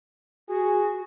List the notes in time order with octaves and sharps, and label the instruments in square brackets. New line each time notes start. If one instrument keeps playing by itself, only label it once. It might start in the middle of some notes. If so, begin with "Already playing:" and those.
[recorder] F#4 [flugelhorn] G#4